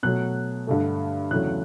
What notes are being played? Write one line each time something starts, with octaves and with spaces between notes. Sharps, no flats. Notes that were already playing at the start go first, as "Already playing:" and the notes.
B2 F#3 A3 F#6
G2 D3 A3
E2 C#3 F#3 A3 F#6